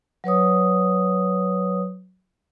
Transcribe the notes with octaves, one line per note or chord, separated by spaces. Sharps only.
F#3 B4 C#5 D#6